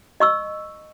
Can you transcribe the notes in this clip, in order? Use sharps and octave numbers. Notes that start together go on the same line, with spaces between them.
D#5 C#6 E6